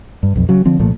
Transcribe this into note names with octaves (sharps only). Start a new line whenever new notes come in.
G2
B1 F2
C#3 F#3
D3 F3 C4
C2 A#2 F3 A3